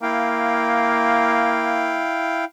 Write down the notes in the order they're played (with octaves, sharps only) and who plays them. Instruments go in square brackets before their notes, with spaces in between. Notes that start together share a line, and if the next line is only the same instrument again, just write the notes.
[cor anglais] A#3 [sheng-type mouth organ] E4 F5 G5